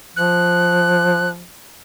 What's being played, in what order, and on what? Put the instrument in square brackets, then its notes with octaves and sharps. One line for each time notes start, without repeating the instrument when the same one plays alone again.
[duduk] F3 [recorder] F#6